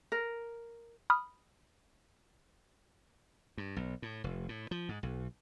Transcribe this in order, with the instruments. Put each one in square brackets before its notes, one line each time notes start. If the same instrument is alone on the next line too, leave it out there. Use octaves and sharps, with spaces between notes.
[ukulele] A#4
[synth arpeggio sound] B5 D#6 F6
[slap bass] G2
B1
A2
F1
A2
F3
G#2
B1